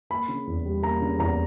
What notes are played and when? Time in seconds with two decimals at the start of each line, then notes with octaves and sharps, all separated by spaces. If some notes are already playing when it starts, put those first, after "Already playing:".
0.10 A#3 B5
0.28 C#3
0.47 E2
0.65 G3
0.82 A#3 A#5
1.02 C#3
1.19 E2 A#5